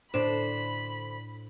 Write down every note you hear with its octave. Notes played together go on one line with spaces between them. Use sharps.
A2 D3 D4 C5 B5 E7